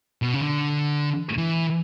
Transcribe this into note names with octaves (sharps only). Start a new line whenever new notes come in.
B2
C#3
D3
E3